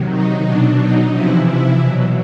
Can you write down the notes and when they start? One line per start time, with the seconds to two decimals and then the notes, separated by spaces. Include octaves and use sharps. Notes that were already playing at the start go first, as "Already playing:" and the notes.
Already playing: C3 D#3 F#3
0.11 D#4
0.45 B2 F#3 D4
0.80 D#4
1.13 C3 E3 F3 E4
1.47 E3 E4
1.81 B2 F#3